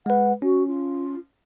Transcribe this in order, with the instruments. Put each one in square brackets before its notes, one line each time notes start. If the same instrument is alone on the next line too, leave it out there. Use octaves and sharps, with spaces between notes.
[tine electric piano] G#3 B4 [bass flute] F#5
[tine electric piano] C#4 [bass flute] F#4
[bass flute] F4